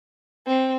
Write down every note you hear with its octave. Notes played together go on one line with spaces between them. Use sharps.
C4